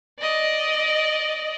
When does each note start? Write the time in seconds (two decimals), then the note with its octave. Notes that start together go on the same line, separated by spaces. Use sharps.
0.20 D5 D#5